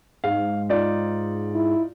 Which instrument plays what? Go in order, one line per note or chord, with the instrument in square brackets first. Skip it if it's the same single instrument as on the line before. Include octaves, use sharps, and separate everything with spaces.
[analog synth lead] G#2 [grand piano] F5
[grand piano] D#4 F4 D5
[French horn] E4